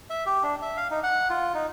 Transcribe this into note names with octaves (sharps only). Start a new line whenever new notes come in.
E5
G4
D4
E5
F5
D#4
F#5
F4
D#4